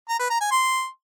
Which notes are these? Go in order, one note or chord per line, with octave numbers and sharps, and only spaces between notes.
A#5
B4
A#5
G#5
C6